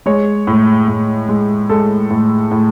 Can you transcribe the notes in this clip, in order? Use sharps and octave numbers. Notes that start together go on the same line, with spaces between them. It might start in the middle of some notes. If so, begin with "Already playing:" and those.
G#3 C#5
A2
A2
G#3
G#3 A4
A2
A2